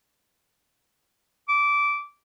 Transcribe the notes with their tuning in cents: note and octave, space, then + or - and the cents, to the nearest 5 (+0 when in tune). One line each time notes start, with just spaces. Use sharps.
D6 -15